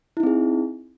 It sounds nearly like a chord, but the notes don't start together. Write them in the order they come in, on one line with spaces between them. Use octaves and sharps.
E4 D#4 C4 G#4